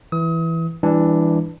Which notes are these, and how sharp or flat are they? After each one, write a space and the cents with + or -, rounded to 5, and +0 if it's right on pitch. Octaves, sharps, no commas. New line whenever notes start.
E3 +0 D#6 +35
E3 +0 G3 +40 D4 +0